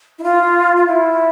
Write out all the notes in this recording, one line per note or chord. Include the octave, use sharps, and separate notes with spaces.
E4
F4
F4
E4